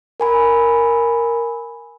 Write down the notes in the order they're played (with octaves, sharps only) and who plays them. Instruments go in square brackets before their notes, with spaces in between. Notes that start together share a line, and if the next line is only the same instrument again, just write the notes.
[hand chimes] A#4 G#5 B5